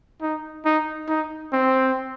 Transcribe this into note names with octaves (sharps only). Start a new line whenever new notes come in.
D#4
D#4
D#4
C4